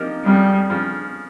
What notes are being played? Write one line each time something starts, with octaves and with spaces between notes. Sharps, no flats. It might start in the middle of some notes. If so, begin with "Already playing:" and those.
Already playing: F3 A#3 D#4 G4 A#4
F2 C#3 F3 G3
C#3 F3